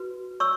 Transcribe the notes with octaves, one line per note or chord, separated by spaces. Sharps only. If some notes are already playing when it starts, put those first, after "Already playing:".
Already playing: F#4 B4
C#5 C#6 E6